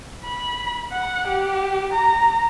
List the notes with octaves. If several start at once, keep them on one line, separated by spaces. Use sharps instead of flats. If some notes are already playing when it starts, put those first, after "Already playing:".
B5
F#5
G4
A#5